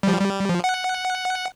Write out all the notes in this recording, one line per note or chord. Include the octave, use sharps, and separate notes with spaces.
F3 G3
G3
F3
F#5